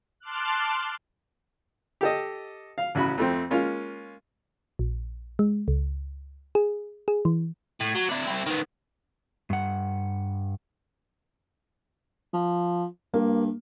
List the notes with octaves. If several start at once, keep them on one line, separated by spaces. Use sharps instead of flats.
A5 C6 D6 F6 F#6
G4 A4 D#5
F5
A1 C#3 F#4 B5
F2 A3 C4
G#3 A#3 C#4 F4
A#1
G#3
C#2
G#4
G#4
E3
A2
F#3
D4 E4
C4 E4
D#3 B3
G2 F#5
F3
G2 A#3